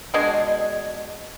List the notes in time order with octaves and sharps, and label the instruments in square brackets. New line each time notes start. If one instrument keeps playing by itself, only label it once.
[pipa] B2 G#3 D4 G#4